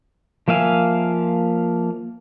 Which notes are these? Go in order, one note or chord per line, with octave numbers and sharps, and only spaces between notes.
F3 A#3 E5 F5 G#5